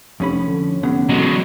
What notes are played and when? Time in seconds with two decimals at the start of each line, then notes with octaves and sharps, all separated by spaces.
0.20 F1 F2 C#4 B5
0.46 D3
0.83 F1 D3 B3 C#4
1.09 E1 F#3 G#3